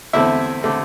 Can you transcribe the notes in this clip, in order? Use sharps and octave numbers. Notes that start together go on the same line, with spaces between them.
E2 D3 A3 C4 E4 E5
D3 A3 C4